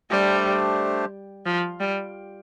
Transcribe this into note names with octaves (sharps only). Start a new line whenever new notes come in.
G3 A3 D4 G4 C5
F3
G3